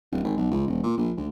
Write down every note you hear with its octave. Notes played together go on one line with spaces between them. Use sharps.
D1
G#1
B1
C#2
E1
A#2
A#1
D2